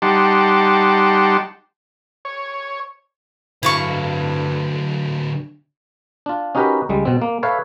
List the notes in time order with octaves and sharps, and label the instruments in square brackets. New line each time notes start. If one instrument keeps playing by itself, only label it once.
[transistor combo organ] G3 D#4 G4 F#5 A5 C6
C#5
[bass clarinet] G2 [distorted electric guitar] D3 F#3 [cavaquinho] E4 F5 C#6
[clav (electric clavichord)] D4 F4
C#4 D#4 F#4 G4 A#4 B4
C#2 G3 G#3
B2 C4
A#3
A4 B4 C#5 E5 F5